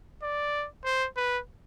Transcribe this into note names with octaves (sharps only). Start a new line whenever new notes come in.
D5
C5
B4